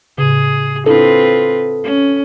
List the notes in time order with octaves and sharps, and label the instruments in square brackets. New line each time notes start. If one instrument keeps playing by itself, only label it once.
[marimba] A2 C#3 [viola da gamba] G#4
[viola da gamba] C4 F4 B4 [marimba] D4 E4 [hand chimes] A4
[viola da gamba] C#4